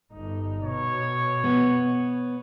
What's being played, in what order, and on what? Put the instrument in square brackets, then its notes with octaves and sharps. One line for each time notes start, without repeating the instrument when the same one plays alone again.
[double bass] G1 D#4
[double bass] B2 [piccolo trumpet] C#5
[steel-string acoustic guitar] B3